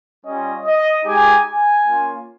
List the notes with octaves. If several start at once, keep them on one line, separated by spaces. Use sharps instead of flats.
G3 C#4 F4 D#5
D#5
G#3 D#4 G4 G#5
G#5
A#3 C#4 F4